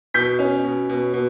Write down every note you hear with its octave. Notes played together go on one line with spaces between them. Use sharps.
B2 G6 B6
C#4
B2
B2
B2